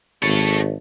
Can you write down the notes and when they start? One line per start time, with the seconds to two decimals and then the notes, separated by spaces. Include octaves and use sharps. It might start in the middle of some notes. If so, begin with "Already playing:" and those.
0.23 G#1 A4 C#5